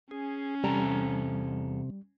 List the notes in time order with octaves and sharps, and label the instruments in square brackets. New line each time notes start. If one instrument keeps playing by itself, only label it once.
[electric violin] C#4 [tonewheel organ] G#4
[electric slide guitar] E2 A4 A#5 [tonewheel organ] C3 [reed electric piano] G3